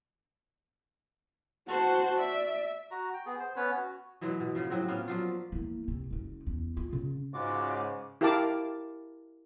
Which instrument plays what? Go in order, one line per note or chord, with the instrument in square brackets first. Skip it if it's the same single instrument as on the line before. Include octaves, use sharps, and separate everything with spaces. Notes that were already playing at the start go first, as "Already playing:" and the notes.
[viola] F#4 C5 [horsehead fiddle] F#5 A5
[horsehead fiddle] D5 [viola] E5
[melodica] F#4 A#5
G5
B3 G#4
C5
B3 C#4 B4 C#5
F#4
[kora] B2 E3 F#3 G#3
B2
C#3 F3
A2 F#3 C4 F#4
A#3 B3 C#4 F4
F3 F#3 D4 F4
[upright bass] E3 A#3
C3
F#1 C#3
E2
F4
C#3
[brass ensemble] G#2 C#3 [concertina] G#3 F4 F#4 [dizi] D6
[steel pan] E4 G4 A#4 F5 A5 D6